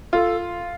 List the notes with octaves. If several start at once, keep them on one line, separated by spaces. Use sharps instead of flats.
F4 A4